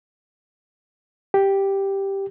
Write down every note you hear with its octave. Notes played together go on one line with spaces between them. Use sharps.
G4